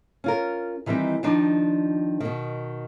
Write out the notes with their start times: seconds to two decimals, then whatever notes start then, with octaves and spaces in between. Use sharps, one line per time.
0.24 C#4 F4 A#4
0.86 D#3 E3 G3 C4 D#4
1.23 D#3 F3 D4 D#4
2.20 B2 D#3